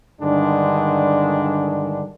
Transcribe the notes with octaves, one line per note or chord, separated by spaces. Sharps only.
G2 D3 D#3 G#3 D4